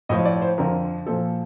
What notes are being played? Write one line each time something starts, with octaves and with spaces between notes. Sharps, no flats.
A2 F3 D#5
D5
C5
F2 D3 F3 A#4
A#2 F3 A4